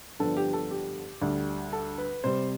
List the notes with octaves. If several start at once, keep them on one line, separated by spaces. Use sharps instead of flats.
G2 D3 F3 B3 D4 A4
G4
A4
G4
D2 D3 G3
A4
B4
C3 G3 C4 C5